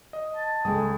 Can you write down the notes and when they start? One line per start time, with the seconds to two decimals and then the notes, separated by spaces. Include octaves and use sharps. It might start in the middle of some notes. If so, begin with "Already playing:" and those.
0.13 D#5
0.36 A5
0.65 C#2 G#3 A3 G5 G#5 D#6